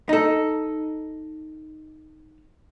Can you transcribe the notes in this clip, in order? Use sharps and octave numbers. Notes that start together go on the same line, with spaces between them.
D#4 A4